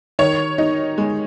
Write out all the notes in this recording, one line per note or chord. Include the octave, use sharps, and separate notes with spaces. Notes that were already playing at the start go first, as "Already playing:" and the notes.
D#3 C#5
D#4
G#3